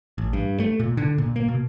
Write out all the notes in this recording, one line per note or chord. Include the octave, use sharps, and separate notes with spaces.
A1
G2
A3
A#2
D3
A#2
A#3
B2